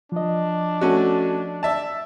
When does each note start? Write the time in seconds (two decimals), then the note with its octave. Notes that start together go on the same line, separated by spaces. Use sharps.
0.12 F3 D4 D#5
0.81 A3 C#4 F#4
1.63 D5 E5 A5